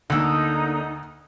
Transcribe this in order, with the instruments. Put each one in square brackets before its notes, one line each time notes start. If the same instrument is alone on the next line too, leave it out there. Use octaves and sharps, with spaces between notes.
[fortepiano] D2 E6 [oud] D3 A#3 [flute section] D#4